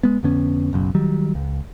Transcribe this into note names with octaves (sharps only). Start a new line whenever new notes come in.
G#3 B3
F2 D3 B3 C#4
F#1 B1 F#2
D#3 F#3 G3
C#2